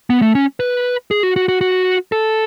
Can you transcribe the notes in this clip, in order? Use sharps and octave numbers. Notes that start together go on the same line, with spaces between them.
B3
A3
C#4
B4
G#4
F#4
F#4
F#4
F#4
A4